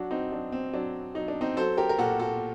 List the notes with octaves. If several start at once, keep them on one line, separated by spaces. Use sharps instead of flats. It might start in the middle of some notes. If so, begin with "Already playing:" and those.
Already playing: F#3 D4 F#4
C4 D#4
F#3 D4
C4
F#3 D4
F#3 D#4
D4
C4 D#4
F#3 A4 C5
G4 A#4
A#4
A#2 F#4 A4
F#4 A4